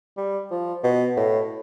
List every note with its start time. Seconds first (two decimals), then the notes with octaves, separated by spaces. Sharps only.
0.17 G3
0.51 F3
0.84 B2
1.17 A2